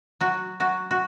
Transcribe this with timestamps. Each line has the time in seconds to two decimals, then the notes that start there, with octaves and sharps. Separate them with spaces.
0.21 F#3 F#4
0.60 F#3 F#4
0.91 F#4